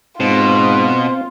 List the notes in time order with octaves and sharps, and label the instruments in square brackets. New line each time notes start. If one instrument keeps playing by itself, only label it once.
[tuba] G#2 [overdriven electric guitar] B2 [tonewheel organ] C4 [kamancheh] F4